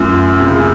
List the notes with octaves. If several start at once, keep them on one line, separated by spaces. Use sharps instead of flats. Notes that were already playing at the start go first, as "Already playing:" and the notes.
Already playing: F#2 A3 C#4 F4
C3
C#3